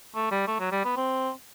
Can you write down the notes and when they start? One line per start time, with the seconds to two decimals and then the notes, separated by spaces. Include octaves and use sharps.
0.15 A3
0.31 G3
0.47 A3
0.60 F#3
0.72 G3
0.84 B3
0.96 C4